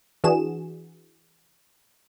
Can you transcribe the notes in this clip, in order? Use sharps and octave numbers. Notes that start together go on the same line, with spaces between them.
E3 D4 F#4 G#4 E7